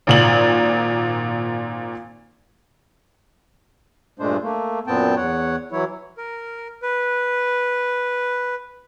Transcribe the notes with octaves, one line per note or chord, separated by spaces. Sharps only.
G#1 A#2 F#7
G2 A#2 G#3 A3 D4 C5
A3 A#3
F#2 A#2 B3 C4 G5 A5
E2 C#5 F#5
E3 F#3 E4 C#5
A#4
B4